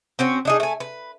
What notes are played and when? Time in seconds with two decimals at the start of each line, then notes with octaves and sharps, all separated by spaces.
0.19 C4 C#4 F#4
0.45 D4 D#4 G#4
0.60 A3 G#5
0.80 B4